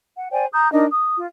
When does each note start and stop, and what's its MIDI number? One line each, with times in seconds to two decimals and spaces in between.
0.17 0.29 78
0.31 0.45 72
0.31 0.45 74
0.31 0.45 79
0.31 0.45 80
0.53 0.70 82
0.53 0.70 87
0.53 0.70 91
0.72 0.85 62
0.72 0.85 63
0.72 0.85 70
0.72 0.85 75
0.91 1.17 87
1.17 1.27 65